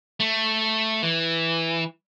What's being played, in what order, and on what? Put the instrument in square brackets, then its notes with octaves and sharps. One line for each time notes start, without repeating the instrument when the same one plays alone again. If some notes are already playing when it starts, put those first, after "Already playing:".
[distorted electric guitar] A3
E3